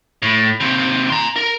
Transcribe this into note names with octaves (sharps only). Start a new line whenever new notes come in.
A2
D#2 C3
A#5 C6
A#4